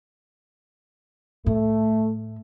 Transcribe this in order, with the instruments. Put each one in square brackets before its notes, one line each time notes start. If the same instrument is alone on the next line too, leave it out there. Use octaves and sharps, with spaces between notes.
[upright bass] A2 [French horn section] A3